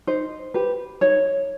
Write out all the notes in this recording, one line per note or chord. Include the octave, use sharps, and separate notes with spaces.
D#4 C5
G4 B4
D#4 C#5